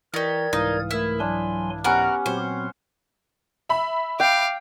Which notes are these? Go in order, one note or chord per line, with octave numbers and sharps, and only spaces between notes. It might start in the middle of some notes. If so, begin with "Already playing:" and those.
E3 D#4 G4 A#4 D5 C#6 G#6
C2 G#2 E3 D#4 F5 D#6
A3 E4 A#4
F#3 D4 G#5 C6
B3 C#4 F#4 G4 A#4 F#5
A#2 F#3 C4 C5 C#5
E5 B5
F5 G5 D6